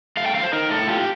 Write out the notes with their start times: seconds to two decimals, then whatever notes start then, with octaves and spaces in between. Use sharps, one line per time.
0.17 A3 F5
0.26 G5
0.34 A3 F5
0.43 C5
0.53 D#4 A#4
0.71 A2 A4
0.89 F4 G4